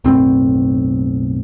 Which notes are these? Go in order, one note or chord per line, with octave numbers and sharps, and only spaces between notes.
B1 F#2 A2 C4